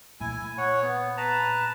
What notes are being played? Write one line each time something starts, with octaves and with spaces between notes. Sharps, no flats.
A#2 E4 G#5
C#5 F#5
B3
B4 A5 A#5